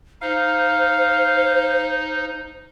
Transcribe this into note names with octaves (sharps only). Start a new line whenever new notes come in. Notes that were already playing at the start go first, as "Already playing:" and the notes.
D#4 C5 F5